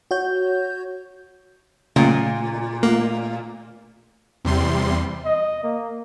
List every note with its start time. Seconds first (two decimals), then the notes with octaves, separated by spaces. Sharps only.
0.11 F#4 C#5 G6
1.96 A#2 C#3 F#3 A3 A#3
2.83 A3 A#3 F4
4.44 E2 C3 G3 C6
5.25 D#5
5.64 A#3